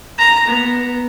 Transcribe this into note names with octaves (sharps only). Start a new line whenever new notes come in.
A#5
B3